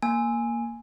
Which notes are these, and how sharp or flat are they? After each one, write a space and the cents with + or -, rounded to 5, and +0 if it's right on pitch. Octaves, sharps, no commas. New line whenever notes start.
A#3 +0 G#5 +0